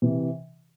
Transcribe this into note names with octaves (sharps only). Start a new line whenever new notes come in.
C3 E3